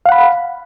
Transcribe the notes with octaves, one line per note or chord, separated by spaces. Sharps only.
F5 F#5 B5